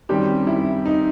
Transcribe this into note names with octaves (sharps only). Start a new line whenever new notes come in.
F#2 D#3 G3 C4 G4
E4
D#4